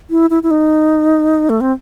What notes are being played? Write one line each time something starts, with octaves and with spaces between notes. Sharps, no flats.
E4
E4
E4
D#4
A3
C4